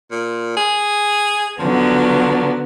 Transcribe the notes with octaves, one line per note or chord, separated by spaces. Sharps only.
A#2
G#4
D3 F3 F#3 B3